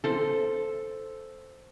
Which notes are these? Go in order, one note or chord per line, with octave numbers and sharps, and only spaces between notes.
A4 C5